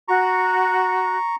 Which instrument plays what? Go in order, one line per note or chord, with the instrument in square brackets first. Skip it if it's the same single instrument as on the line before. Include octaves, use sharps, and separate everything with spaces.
[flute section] F#4 [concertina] A#5 C#6